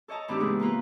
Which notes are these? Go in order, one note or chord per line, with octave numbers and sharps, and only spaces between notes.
A4 C#5 D#5 A5 A#5
A2 E3 C4 D4 D#4 G4
C#3 G#3 B3 G#4
A#3 D#4 F4 B4